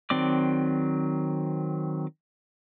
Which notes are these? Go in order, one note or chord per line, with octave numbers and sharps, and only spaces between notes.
D#3 F#3 C4 D5 D6